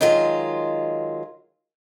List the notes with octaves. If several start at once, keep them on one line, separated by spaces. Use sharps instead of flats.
D#3 F#3 G#3 F4